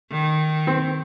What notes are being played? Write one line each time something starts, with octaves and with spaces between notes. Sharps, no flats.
D#3
C4